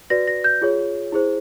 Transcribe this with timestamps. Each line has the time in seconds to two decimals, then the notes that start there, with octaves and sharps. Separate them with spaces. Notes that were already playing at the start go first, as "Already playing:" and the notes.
0.10 F#4 B4 D5 A#6
0.27 A#6
0.44 G6
0.62 F4 G#4 C#5
1.12 E4 G#4 C5